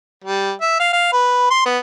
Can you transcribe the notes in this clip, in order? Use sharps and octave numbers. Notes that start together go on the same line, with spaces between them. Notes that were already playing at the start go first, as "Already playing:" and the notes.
G3
E5
F5
F5
B4
C6
B3